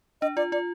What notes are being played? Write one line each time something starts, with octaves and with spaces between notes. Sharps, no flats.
D4 D#5
F4 D5
F4 D5